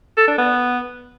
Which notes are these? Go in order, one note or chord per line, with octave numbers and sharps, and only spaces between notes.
A4
D4
B3